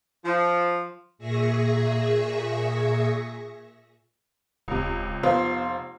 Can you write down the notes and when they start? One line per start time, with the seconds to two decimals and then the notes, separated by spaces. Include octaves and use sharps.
0.25 F3
1.19 A#2 G#4 E5 C#6 A#6
4.68 D#1 C#2 C3
5.23 F1 B3 F4 C5